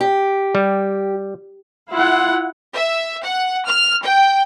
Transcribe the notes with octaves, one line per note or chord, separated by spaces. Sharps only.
G4
G3
E4 F4 F#5
E5
F#5
F6
G5